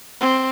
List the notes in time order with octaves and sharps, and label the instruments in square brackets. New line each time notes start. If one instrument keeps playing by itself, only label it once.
[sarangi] C4